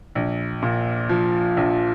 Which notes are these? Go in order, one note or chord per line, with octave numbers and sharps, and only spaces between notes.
A#1
A#2
F3
A#1